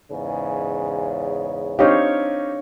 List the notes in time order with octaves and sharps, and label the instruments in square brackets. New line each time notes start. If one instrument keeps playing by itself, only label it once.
[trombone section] E2 G#2 C#3
[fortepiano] C4 D#4 G4 [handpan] D4 C#5 F5